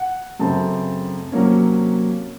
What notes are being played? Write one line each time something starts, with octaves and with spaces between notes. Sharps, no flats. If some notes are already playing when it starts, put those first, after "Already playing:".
Already playing: F#5
F#2 C#3 A3 C4 A5
C3 F#3 A#3 C#4